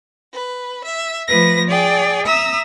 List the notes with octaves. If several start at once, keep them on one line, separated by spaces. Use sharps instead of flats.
B4
E5
F3 A3 B4 A#6
G#4 D5 G5
E5 A#5 D#6 E6